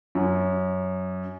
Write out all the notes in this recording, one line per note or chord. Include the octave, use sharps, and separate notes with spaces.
F#2